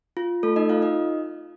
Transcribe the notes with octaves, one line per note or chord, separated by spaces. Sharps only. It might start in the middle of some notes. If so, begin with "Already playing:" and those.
F4
A3 A4
D#4 D#5
F4 F5
D#4 D#5